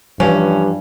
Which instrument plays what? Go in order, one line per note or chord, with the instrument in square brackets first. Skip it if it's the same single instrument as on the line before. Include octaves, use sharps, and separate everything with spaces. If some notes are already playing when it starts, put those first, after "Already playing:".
[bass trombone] G2 [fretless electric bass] E3 F3 [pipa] C#4